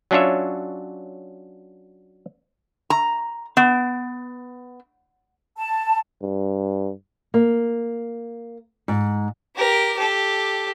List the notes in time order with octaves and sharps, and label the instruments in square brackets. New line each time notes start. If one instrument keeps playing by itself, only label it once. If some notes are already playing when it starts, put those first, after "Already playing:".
[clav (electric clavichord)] F#3 C#4 D4 F4 C#5 E5
[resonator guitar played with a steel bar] A#5
B3
[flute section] A5
[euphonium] G2
[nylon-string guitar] A#3
G#2
[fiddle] G4 A#4
G4 A4